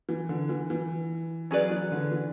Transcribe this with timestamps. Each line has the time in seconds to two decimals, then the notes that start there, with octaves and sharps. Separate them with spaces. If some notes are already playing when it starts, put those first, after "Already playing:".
0.09 E3
0.29 D3
0.49 E3
0.70 E3
1.51 F#3 C#4 G#4 B4 D5
1.70 E3
1.92 D3
2.11 E3